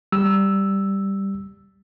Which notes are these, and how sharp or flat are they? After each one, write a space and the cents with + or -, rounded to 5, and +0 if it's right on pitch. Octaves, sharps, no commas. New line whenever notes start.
G3 +0 E6 +0